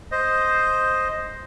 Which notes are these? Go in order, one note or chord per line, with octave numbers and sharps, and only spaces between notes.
C5 D#5